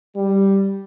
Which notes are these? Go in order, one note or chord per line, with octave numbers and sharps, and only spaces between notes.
G3